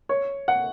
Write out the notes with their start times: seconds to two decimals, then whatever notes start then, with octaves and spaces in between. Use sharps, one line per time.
0.09 C#5
0.48 F#5